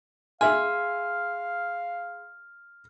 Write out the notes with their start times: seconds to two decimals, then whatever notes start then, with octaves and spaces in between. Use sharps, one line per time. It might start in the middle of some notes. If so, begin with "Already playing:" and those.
0.41 G#4 E5 F5 G#5 C6 F6